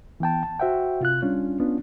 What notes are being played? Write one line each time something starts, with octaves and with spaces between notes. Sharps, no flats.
E3 B3 G5 A5
A5
F#4 C5 E5 F#5 G5
C3 F4 F#6
G3 C#4 D4 F4
B3 C#4 D4 F4